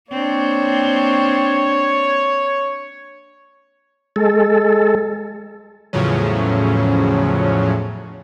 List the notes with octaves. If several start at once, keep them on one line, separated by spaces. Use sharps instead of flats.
A#3 C4 D4 C#5
G#3 A4
E2 A2 C#3 F3 F#3 C#4